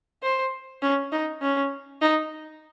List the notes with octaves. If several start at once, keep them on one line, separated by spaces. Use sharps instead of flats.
C5
C#4
D#4
C#4
D#4